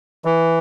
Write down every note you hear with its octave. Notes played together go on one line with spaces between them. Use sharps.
E3